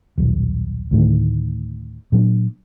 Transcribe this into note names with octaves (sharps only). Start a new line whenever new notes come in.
D#1 B1
D2 A2 D#3
A#2 F#3 D4